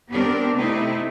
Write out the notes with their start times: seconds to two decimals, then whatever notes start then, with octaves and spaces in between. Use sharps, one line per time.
0.11 B3 C4 D4 G4 A#4
0.57 C3 A3 C4 D#4 E4